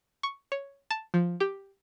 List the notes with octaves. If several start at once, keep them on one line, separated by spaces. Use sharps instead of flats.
C#6
C#5
A5
F3
G4